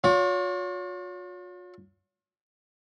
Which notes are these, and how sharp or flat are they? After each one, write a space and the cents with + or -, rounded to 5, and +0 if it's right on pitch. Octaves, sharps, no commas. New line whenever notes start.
F4 +45 C#5 +30